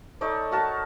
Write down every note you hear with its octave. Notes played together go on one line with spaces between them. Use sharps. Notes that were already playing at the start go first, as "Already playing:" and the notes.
D#4 A4 C#5 D5
F#4 A#4 A5